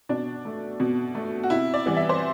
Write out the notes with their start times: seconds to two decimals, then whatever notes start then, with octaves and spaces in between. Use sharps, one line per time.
0.09 B2 D4
0.45 A3
0.80 B2
1.15 A3
1.43 F#4
1.50 C3 E4
1.74 D5
1.86 E3 G3 B3
1.97 E5
2.09 C5